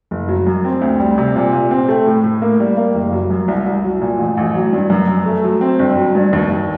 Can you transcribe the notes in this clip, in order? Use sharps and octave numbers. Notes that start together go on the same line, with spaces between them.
F#1
F#3
F#2
C4
D2
G3
C3
A#2
A#2
C4
A3
A2
A2
A#3
G3
A#3
F#1
F#3
F#2
C2
C2
F#3
A#2
A1
A1
F#3
G2
F#2
F#2
A3
F#3
C4
G1
F#3
G2
D#2
D#2